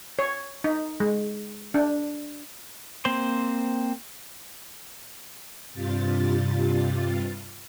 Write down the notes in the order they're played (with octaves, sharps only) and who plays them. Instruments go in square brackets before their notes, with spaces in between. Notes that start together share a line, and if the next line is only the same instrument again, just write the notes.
[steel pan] C#5
D#4
G#3
D4
[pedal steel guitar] A#3 C4 C5 C6
[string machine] G2 C3 G3 F4 A6